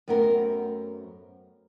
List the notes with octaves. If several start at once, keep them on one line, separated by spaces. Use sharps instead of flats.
F#2 A3 B3 C4 A#4